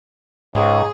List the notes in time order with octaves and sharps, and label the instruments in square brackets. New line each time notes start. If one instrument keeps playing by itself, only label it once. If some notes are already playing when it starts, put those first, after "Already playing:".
[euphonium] C#2 [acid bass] G#2 [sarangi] G#4